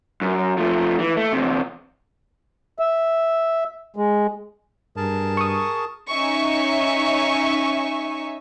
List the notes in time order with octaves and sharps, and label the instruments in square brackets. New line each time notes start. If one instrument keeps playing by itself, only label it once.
[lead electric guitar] F#2
F3 A3
E3
A3
E2 C3
[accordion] E5
G#3
[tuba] G2 [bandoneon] G#4 A#4 A5
[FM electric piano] C#6 D#6
[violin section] C#4 D#4 E5 G#5 C#6